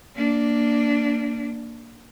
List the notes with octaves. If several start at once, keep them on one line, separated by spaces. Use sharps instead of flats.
A#3 D4